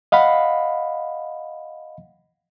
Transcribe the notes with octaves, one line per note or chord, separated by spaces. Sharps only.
D#5 F5 F#5 B5